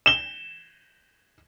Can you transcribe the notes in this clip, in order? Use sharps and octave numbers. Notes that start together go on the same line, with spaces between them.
E7 G7